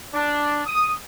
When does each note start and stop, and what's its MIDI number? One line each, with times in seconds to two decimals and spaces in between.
0.14 0.63 62
0.66 0.91 87